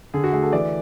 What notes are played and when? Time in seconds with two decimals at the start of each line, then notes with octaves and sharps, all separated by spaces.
0.14 D3 G#4
0.24 F#4
0.33 A3 G#4
0.43 A4
0.53 E3 D5